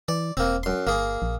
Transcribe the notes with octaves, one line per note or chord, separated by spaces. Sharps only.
E3 D5
E1 A#3 C4
F#2 C6
G1 A#3 G#4
A#1